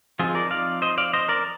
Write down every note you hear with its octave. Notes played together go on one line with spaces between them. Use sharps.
F3 C4 D#4 F4 G#4
A#4 D5
D5 F5
C5 D#5
D5 F5
C5 D#5
A#4 D5